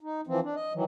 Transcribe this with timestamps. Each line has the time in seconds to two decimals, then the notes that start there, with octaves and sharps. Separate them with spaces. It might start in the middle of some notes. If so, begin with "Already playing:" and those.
0.01 D#4
0.27 E3 F3 C4
0.43 D4
0.55 D#5
0.73 D#3 E3 F#3